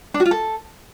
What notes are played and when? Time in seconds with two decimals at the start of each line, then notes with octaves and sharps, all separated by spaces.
0.14 D4
0.20 F#4
0.26 F4
0.31 A4